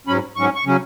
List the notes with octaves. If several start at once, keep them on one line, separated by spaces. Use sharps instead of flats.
G#2 F#3 C#4 B5
G#2 F#3 C#4 C#6
C#6
C#3 F#3 C#4